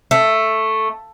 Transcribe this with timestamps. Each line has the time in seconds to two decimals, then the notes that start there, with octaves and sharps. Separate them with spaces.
0.11 A3